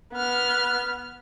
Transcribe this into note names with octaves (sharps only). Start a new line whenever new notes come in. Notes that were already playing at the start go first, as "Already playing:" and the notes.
B3 F6